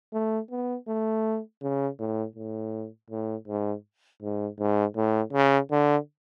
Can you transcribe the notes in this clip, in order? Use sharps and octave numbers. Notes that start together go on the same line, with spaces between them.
A3
B3
A3
C#3
A2
A2
A2
G#2
G#2
G#2
A2
C#3
D3